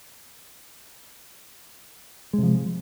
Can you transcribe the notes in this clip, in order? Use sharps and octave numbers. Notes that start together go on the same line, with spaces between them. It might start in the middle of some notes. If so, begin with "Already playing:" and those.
C3 F3 G#3